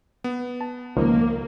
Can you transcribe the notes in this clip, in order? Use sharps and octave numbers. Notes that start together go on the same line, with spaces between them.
B3
A5
C#2 D#3 F3 A#3